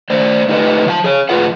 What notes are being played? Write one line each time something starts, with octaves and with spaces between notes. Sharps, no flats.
A3 C5 D5
A3 D#4 G4 A4 B4 D#5
F3 F5 A5
G#4 C#5
F2 A2 F4 G#4 B4 F#5